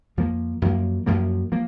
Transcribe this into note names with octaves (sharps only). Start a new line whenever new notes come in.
F2 F3 A#3
F#2 F3 A#3
F#2 F3 A#3
F3 A#3